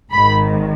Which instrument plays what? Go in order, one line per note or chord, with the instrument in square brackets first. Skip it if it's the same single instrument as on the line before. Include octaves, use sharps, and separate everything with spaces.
[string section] G#1 G#2 D#3 B5